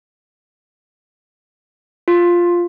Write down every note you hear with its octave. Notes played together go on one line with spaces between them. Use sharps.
F4